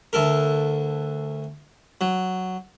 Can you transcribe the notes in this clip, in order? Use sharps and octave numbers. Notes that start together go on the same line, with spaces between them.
D2 A4 A#4
F#3